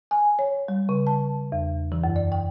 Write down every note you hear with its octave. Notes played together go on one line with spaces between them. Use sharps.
G#5
C#5
G3
C#3
A5
E2
E3
F#2
D5
G5